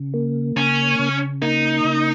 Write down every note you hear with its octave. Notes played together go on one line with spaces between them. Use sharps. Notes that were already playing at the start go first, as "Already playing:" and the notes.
Already playing: C#3
A#3
C#3 C#4
C#3
A#3 D#4
C#3